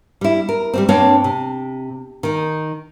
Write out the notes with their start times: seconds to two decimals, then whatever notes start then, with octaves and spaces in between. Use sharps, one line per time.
0.21 G3 E4
0.49 A#4
0.74 G3 A#3 C4
0.89 G2 A#3 C4 D4 C#5
1.24 C3
2.23 D#3 D#4